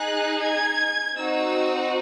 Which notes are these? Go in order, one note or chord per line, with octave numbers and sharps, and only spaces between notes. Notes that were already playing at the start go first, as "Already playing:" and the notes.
Already playing: D#4 G#4 F#6
G#6
C4 D#4 F#4 E6